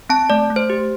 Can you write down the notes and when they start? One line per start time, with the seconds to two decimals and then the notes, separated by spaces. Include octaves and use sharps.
0.09 C4 A5
0.30 A3 D5
0.50 A3
0.56 C5
0.70 G4